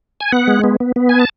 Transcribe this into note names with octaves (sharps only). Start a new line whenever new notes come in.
G#5
B3 F#5
G#3
B3
B3
B3
G#5
A5